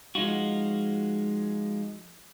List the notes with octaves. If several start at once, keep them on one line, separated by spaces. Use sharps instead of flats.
F3 G#3 D#4 F4 F#4